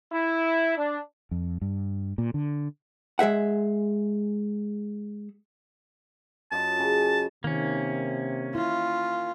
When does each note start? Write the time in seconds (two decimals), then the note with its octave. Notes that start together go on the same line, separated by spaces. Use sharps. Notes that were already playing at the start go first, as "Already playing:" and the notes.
0.12 E4
0.77 D4
1.31 F2
1.62 G2
2.18 A#2
2.34 D3
3.19 G#3 G#4 E5 F#5
6.52 F#2 F4 D#5 A5
6.79 C#3
7.44 C3 D#3 A#3 C#4
8.55 E4 F4